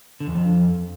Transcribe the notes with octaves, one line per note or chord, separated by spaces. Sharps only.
D3
E2
F2